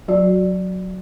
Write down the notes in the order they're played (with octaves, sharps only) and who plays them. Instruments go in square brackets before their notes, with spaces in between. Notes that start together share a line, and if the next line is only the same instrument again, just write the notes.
[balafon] F#3 F#4 D5